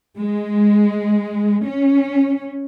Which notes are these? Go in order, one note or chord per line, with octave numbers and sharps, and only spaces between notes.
G#3
C#4